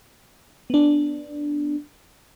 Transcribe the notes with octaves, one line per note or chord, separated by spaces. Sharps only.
B3 D4